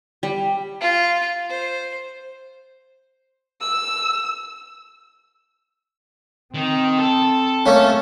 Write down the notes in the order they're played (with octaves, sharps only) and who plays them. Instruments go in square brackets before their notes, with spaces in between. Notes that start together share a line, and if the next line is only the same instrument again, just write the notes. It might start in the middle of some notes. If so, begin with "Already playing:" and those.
[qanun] G3
[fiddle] F4
C5
[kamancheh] E6
[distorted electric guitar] D#3 [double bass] C4
[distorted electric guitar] A4
[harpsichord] A3 A#3 C#4